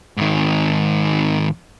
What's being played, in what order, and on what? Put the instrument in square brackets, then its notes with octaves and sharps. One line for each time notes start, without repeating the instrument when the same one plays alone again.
[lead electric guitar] G#2 D#3